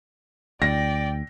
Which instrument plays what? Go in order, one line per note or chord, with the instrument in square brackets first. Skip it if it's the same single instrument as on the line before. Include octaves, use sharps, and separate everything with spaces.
[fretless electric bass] D2 [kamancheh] D5 G5 [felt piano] A#6